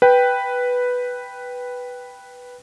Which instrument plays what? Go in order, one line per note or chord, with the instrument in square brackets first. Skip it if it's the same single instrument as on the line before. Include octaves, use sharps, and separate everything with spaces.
[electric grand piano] B4 G5